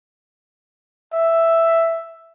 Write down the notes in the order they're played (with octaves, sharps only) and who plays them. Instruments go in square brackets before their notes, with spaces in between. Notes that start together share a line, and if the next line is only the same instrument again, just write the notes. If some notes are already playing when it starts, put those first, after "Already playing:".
[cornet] E5